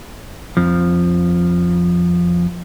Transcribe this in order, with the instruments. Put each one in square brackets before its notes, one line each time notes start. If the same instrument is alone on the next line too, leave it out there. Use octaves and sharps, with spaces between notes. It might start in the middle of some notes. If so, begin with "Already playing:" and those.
[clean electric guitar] F2 F3